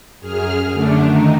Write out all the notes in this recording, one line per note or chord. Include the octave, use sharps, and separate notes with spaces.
F#2 G#4 F6
F#2 D3 A3 D4
D#3 D#4